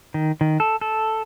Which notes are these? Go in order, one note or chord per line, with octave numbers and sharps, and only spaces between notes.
D#3
D#3
A4
A4